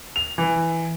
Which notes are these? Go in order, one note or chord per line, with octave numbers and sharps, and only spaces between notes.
F7
E3